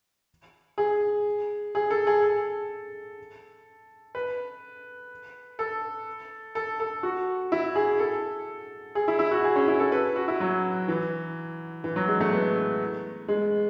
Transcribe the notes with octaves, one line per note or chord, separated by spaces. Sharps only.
G#4
G#4
A4
G#4
A4
B4
A4
A4
A4
F#4
E4
G#4
A4
G#4
E4
E4
F#4
G#4
C#4
E4
A4
B4
F#4
E4
F#3
E3
E3
F#3
G#3
A3
B3
G#3